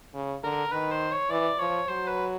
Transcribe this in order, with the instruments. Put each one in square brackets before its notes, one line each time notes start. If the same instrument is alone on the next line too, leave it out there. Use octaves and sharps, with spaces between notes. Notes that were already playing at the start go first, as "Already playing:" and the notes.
[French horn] C#3
[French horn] D3 [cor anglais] A#4
[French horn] D#3 [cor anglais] B4
[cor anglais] C5
C#5
[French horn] E3 [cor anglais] D5
[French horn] F3 [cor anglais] C#5
[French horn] F#3 [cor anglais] C5
[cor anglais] B4